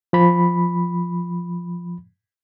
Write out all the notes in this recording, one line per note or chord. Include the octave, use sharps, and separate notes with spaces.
F3 B5